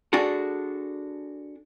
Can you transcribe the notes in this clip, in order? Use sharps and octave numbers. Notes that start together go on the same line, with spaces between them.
D4 F#4 G#4 A4